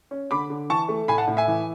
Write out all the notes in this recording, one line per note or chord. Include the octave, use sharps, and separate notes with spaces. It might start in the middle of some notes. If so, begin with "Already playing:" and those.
C#4
D3 B5 D6
D3
E3 A5 C#6
A3
A2 G#5 B5
F#5 A5
A2
E5 G#5
E3